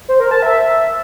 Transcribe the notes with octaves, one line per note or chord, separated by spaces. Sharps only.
C5
A#4
A5
E5